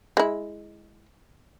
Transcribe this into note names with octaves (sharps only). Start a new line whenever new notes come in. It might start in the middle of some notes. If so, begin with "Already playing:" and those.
G#3 E4